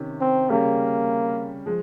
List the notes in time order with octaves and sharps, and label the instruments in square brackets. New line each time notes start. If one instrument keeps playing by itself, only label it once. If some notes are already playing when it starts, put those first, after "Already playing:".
Already playing: [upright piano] C3 D#3 C#4
[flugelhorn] C4
[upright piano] C#3 G3 C#4 [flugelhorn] A#3
[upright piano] F3 G#3